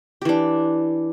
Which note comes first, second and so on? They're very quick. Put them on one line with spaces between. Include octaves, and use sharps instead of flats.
G4 E3 D4